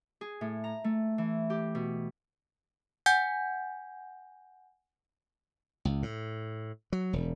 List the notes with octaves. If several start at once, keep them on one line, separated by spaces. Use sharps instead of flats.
G#4
A2
A#5
A3
E3
G4
B2
F#5 G#5 G6
C#2
A2
F#3
E1